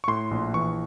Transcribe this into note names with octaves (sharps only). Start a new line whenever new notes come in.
C#6
A2 C6
A#1
E3 C#6